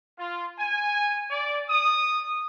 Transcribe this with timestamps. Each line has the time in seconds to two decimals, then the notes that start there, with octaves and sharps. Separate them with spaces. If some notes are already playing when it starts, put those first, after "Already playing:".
0.19 F4
0.58 G#5
1.31 D5
1.69 D#6